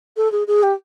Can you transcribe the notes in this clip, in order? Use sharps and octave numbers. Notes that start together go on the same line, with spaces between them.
A4
G#4
G#4
G4